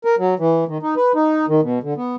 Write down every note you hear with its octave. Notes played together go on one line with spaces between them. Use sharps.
A#4
F#3
E3
D#3
D#4
B4
D#4
D#3
B2
D3
B3